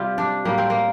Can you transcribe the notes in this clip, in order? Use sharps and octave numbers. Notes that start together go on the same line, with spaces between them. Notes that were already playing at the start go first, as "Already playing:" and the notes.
Already playing: C3 G3 F4
D4
A2 G3 A#3
C4
A#3